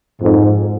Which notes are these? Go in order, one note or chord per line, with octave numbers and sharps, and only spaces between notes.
F2 G#2